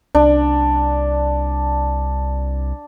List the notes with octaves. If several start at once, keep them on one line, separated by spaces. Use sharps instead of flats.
C2 D4